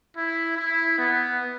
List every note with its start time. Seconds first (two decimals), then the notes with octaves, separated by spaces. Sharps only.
0.17 E4
0.57 E4
0.98 B3